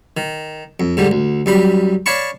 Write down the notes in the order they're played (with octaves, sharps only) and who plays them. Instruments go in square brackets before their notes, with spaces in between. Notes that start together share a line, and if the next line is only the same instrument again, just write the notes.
[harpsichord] D#3
F2
G#2 D3 G3
D2
F#2 G3 B5
C#5 D5 F5 A5 B5 C#6